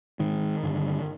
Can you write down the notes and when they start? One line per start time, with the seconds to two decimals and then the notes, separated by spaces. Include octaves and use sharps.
0.19 G#2 D#3
0.63 G2 D3